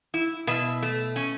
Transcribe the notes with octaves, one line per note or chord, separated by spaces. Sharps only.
E4
B2 E5
A3
C#4